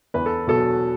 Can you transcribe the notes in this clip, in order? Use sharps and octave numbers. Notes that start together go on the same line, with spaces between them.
E2 B4
A4
B2 F#3 A4